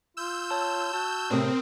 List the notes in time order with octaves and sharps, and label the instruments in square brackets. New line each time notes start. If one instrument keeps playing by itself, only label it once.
[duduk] F4 [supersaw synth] E6 G6
[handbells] C#5 A5
[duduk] F#4 [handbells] A5
[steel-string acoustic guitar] A2 C3 [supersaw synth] C4 [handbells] A#4 D#6